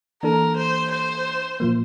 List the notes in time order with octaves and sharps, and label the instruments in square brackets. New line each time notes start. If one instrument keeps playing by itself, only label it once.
[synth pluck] E3 A#3 D4 A4 [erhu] A#4
[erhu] C5
C5
[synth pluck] A#2 F3 A#3